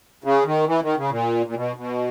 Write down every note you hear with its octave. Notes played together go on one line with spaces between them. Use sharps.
C#3
D#3
E3
D#3
C#3
A#2
A#2
B2
B2